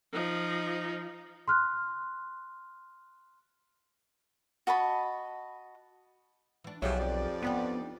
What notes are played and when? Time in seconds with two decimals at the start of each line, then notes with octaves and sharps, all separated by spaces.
0.13 F3 D#4
1.48 C6 F6 F#6
4.67 F#4 D#5 A5 B5
6.64 E3 D4
6.82 B1 F3 F#3 G4 G#4 C#5 E5
6.99 F2 F3 D5
7.42 B3 D4 D#4 G4